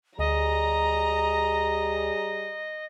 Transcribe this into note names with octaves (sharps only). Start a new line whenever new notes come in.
D2 G3 G#4 D#5 A#5